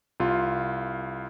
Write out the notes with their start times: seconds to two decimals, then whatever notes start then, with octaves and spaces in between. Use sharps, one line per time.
0.20 C2 F4